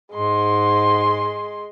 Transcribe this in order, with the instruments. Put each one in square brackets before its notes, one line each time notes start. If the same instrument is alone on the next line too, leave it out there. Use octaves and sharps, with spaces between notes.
[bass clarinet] G#2 [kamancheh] G#3 C6